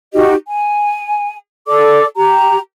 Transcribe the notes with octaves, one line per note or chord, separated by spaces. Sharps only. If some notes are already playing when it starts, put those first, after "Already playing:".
D#4 F#4 G4 D#5
G#5
A4 D5 D6
G4 A#5